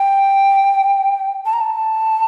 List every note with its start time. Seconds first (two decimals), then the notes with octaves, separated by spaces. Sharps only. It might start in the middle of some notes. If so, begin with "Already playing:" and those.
Already playing: G5
1.46 A5
1.53 A#5
1.61 A5